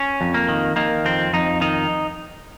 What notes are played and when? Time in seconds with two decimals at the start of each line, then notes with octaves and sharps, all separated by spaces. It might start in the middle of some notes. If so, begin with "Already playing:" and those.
Already playing: C#4
0.21 F2
0.34 A#3
0.49 D#3
0.76 D#3 A#3
1.05 F2 C4
1.33 F2 D#4
1.61 D#3 D#4